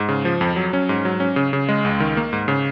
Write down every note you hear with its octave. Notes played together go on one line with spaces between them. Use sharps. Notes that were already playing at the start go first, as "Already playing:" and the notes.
Already playing: G#2
C#3
F3
F2
F#3
C#4
G#2
F#3
C#4
C#3
C#3
G#3
C#2
D#3
A#3
G#2
C#3